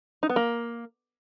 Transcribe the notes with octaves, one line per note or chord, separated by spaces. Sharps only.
D#4
B3
A#3